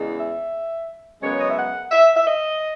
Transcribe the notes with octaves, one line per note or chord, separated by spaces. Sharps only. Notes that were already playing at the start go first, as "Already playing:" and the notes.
Already playing: E2 C#3 G#3
E5
F#2 C#3 G#3 B3 C#5
D#5
E5
F#5
E5
E5
D#5